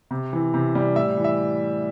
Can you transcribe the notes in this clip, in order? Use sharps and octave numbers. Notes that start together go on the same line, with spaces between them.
C3
E3
C3
G3
A2 E5
E3
E5